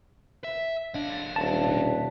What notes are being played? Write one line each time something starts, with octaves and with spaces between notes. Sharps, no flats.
E5
F#1 B1 D4 D#5 F5
D#1 A5
B2